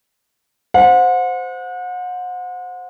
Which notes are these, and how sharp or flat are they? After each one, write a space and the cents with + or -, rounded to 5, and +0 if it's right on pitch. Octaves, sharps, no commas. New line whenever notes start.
C5 -10 F#5 -35